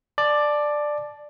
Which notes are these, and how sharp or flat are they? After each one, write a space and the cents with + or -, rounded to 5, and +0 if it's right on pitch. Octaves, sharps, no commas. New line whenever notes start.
D5 +10 A5 -20